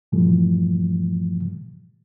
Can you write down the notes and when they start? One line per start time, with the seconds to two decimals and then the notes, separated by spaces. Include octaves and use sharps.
0.12 G2 A#2 E3 F3 G3 A3